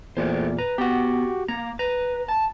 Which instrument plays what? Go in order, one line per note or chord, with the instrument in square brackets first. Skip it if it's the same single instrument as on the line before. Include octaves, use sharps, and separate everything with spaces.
[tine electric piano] E2 A#2 [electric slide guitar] A3 A#4 C5
[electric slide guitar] B4 [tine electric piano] A#5
[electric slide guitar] B3 [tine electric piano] F#4 G4
[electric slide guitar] A#3 [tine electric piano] A#5
[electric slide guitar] B4 [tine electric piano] A#5
[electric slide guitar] A5